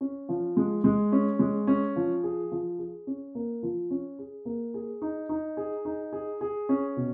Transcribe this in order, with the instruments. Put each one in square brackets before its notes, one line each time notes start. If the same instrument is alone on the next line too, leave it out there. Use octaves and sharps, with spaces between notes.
[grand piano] C#4
F3
G#3
G#3
C#4
G#3
C#4
F3
G#4
F3
G#4
C#4
A#3
F3
C#4
G#4
A#3
G#4
D#4
D#4
G#4
D#4
G#4
G#4
C#4
B2